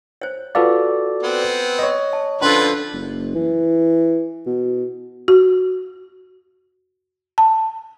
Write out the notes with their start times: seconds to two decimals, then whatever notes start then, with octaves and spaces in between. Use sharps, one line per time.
0.22 C5 C#5
0.55 F4 F#4 A4 B4 D5 F5
1.23 B3 C4
1.79 C#5 D#5
2.13 A5
2.42 D3 F3 C#4 D4 A4 B4 C6
2.93 F#1
3.35 E3
4.46 B2
5.28 F#4
7.38 A5